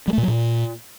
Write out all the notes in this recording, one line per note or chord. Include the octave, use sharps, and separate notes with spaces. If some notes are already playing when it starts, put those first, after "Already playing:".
G3
A3
A#2
F#3
A#2